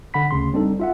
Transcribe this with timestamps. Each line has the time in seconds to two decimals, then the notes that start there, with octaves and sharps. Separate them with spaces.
0.14 D3 F#5 B5 B6
0.31 D2 C#3 C6
0.53 G3 C4 D4 D#4 A4
0.80 F4 E5 F#5